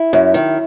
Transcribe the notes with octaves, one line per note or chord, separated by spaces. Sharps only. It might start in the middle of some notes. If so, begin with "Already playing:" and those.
Already playing: E4
F#2
D#3